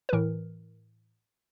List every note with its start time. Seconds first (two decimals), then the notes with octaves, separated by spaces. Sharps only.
0.09 B4
0.13 A2 E3 A#4